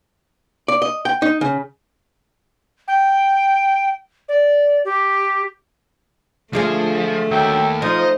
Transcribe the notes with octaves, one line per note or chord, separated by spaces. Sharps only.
D5
D#5
G5
D#4
C#3
G5
D5
G4
D2 F3 G#3 A3 F4
D#2 F#3 E5 G5
F3 D#4 C5 D#5